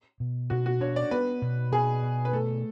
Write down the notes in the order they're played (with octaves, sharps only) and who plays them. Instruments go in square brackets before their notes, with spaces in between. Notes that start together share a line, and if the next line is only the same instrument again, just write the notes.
[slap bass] B2
[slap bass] B2 [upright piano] F#4
[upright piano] F#4
[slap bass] D4 [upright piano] C#5
[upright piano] D5
[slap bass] B3 [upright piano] B4
[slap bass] B2
[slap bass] B2 [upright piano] G#4
[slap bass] B2
[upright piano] B4
[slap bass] A3 [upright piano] A4